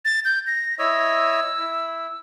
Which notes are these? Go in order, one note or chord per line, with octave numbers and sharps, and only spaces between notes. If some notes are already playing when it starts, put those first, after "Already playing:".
A6
G6
A#6
E4 C#5 D#5 E6
E4